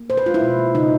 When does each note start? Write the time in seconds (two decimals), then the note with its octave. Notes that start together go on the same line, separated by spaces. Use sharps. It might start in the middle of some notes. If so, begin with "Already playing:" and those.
Already playing: A#3
0.10 A#2 C5
0.17 B4
0.26 G#3 F4
0.34 E4
0.43 B2
0.59 A#3
0.75 C#3 D#4